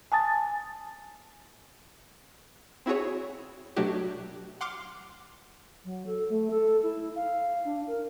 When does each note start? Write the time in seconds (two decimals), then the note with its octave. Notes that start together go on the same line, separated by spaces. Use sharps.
0.12 G#5 A5 D#6 A6
2.86 C4 E4 F#4 G#4 C#5
3.76 B2 F#3 A3 D4 F#4 G4
4.61 F#5 C6 D6 F6
5.85 F#3
6.07 A4
6.29 A3
6.51 A4
6.83 E4
7.15 F5
7.65 D4
7.87 A#4